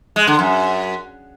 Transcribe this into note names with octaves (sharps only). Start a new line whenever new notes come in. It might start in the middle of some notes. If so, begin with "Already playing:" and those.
G#3
D3
F#2